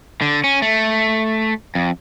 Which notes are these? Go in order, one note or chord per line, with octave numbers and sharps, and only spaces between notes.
D3
C#4
A3
F2